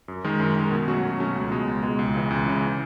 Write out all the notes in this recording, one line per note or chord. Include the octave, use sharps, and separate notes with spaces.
F#2
D#3 G#3
F#2
D#3 G#3
B2
F#3 A3 C#4 F#4
B2
F#3 A3 C#4 F#4
C#2
B2 G#3
C#2
B2 G#3
C#2
C#3 E3
C#2
C#3 E3